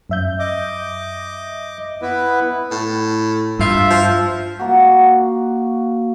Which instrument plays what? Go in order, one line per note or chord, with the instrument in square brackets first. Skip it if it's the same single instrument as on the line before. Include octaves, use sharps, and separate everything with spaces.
[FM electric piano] F#2 E5 G6
[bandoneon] D#5 D6
B3 E4 B4
[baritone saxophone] A2
[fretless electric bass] G2 [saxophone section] F4 E5
[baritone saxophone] F3
[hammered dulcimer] A#3 F#4